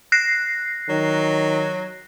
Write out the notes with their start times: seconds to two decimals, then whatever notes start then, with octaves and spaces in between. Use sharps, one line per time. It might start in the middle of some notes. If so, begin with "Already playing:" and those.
0.12 F#6 A#6 C7
0.89 D#3 F#3